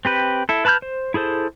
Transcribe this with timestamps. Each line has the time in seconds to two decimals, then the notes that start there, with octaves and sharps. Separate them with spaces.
0.05 C4 G4 B4
0.49 E4 A4
0.65 B4 A5 B5 F6 G6
0.82 C5
1.14 E4 G#4 A4 C5